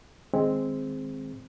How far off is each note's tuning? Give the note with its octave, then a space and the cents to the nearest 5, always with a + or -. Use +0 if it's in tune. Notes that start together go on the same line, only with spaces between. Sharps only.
D#3 +0 G#3 +0 C4 +0